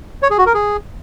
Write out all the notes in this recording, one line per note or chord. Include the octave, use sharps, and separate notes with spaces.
C#5
G#4
F#4
A#4
G#4